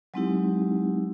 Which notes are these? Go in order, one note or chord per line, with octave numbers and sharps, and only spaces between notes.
F#3 G#3 C4 D#4 E4 G4